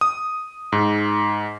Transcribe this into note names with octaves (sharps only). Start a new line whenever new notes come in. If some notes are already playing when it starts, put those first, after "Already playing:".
D#6
G#2